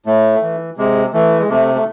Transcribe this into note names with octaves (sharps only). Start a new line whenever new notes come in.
A2 A3
E3
C3 G#3
E3 A3
G#3
C3 A3
A3